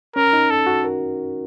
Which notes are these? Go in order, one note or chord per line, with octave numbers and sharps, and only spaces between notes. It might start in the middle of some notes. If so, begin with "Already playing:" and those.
C#4 A#4
D#4
A4
F#4
A#4